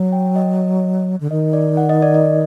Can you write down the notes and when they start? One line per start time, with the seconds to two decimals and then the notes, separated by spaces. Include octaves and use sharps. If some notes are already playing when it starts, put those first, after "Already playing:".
Already playing: F#3
0.12 G5
0.36 D#5
1.20 D3
1.30 D#3 D#5
1.53 D5
1.77 F#5
1.89 D#5
2.02 D5
2.14 D#5